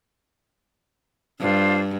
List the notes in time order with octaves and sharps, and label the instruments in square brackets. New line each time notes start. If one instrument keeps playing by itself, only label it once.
[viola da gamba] G2 [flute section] D4 F4 C5